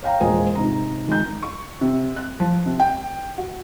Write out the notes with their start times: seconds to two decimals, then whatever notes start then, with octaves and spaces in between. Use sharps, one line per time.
0.03 C#5 F5 G5 A#5
0.20 E1 A#2 G#3 G#4 C5
0.55 G#2 C3 A#5
1.07 D#3 G#3 A#5 G6
1.43 C#6
1.81 C3
2.16 F#6
2.40 F3
2.66 C3
2.80 G5
3.38 F#4